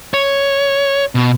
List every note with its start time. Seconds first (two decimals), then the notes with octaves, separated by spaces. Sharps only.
0.14 C#5
1.15 B2